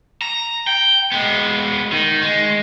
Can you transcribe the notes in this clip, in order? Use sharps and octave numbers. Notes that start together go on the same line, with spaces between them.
A#5
G5
G#3 B3
D#3
G#3